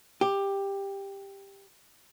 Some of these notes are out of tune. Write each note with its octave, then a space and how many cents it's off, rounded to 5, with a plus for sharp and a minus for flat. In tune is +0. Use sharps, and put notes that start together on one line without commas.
G4 +10